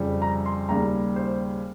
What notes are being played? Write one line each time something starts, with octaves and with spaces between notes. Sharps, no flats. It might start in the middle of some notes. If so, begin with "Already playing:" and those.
Already playing: F2 C#3 G3
A#5
C6
D#2 C#3 G3 A#5
C5